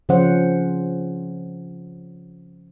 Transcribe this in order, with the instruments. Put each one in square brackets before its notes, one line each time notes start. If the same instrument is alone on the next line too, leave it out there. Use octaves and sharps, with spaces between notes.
[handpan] C#3 F3 C#4 C5 F#5